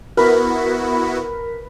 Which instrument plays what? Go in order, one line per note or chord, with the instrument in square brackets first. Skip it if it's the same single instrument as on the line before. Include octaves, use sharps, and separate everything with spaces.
[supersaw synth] B3 E4 F#4 [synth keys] A#4 [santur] B4